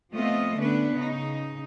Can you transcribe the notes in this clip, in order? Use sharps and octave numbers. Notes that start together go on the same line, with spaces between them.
F3 A3 B3 C4 F4 D#5
D3 B3 C#4 D4 B4
C#3 D#4